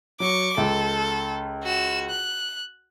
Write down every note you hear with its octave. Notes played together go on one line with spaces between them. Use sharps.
F#3 C#6 D6
C#2 A4
F#4 E7
F#6